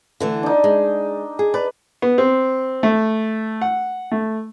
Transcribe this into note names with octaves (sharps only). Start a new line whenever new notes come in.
D3 E3 A3
D4 D#4
G#3
G#4
B4 D5
B3
C4
A3
F#5
A3